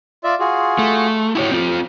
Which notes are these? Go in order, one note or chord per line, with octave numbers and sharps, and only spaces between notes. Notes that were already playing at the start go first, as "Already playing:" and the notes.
F4 D5 E5
F4 F#4 G#4
A3
E4 F#4 G4 C#5
C4 F4